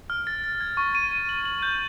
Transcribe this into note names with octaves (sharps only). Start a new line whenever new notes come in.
F6
A6
A6
G#6
C#6
D#7
D#7
F#7
F#7
G6